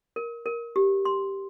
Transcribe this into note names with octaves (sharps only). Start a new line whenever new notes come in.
A#4
A#4
G4
C6